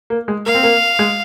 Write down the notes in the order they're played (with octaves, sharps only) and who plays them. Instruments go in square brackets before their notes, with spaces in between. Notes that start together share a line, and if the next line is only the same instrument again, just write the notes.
[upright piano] A#3
G#3
[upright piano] A#3 [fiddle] F5
[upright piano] C4
A#3
G#3